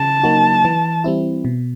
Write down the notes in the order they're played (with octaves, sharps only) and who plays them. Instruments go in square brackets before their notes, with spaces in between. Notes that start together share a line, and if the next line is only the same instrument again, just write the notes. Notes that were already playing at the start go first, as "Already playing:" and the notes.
Already playing: [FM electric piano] C#3 [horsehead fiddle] A5
[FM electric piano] F#3 A#3 D#4 F#4
E3
G3 C4 E4
B2